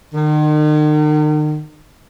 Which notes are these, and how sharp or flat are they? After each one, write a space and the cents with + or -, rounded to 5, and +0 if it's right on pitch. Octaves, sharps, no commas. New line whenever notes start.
D#3 -40